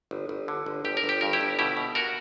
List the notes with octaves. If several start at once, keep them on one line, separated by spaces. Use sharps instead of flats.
G1
G1
D3
G1
G1 G4
A#4
G1
G4
G2 A#4
E4 G4
G1
B2 E4 G4
B2
F#4 A#4